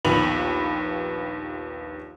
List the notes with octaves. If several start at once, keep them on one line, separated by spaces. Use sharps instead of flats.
A#1 D#2 B3 B4 F7 F#7